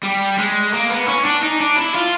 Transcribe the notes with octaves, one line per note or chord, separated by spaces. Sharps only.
G3
G#3
A#3
B3
C#4
D4
D#4
D4
E4
F4